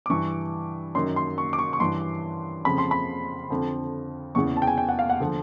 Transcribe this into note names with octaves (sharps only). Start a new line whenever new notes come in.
D6
G2 E3 C#6
F#2 D#3 C6
C6
C#6
D6
C#6
C#6
G2 E3 C6
F2 C#3 F3 B5
C6
B5
F2 D3 F3
E2 C#3 E3 C#6
A5
G5
G#5
G5
F#5
F5
F#5
D3 F3